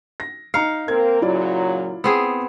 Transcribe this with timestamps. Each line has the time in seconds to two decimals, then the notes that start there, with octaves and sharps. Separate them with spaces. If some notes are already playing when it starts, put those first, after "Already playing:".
0.20 A#6
0.54 D#4 F5 A#5 C#7
0.88 A#3 C4 A#4 G#6
1.22 A#2 C#3 F#3 E4 F4 D5
2.04 B3 C4 G#4